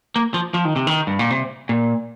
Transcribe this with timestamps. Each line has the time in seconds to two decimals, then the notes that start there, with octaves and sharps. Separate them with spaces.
0.16 A#3
0.34 F3
0.54 F3
0.65 D#3
0.76 C3
0.87 D#3
1.07 G2
1.19 A#2
1.30 C3
1.69 A#2